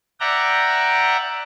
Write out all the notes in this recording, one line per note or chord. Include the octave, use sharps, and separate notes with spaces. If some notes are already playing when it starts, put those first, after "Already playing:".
D5 E5 F#5 G5 A#5